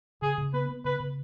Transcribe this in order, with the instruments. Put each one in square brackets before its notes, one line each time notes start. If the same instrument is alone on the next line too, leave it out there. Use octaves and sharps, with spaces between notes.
[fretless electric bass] C#3 [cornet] G#4
[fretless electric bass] C#3
[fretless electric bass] B3 [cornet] B4
[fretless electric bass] B3
[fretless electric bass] C#3 [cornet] B4
[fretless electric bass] C#3